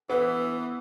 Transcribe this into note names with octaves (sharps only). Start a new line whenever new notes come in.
E3 B3